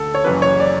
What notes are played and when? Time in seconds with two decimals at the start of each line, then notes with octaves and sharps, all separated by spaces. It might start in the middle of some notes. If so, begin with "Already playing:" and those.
Already playing: D2 D3 A4
0.15 C#5
0.24 F#1 F#2 C#3 E3 B4
0.42 C#5
0.60 D5